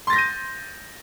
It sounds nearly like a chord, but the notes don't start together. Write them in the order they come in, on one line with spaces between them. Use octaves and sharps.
C6 A6 A#6 G6 D#7